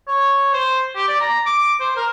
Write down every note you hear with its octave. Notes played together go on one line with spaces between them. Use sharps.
C#5
C5
G4
D5
A#5
D6
C5
A#4